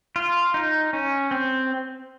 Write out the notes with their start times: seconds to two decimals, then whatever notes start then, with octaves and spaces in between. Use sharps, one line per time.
0.16 F4
0.54 D#4
0.93 C#4
1.31 C4